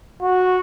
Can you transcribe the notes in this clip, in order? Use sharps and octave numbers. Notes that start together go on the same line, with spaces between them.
F#4